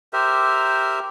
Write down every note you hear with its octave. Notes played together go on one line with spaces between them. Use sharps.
G4 A#4 C5 E5